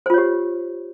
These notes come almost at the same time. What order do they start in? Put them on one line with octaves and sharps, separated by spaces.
C5 F4 C#5 G4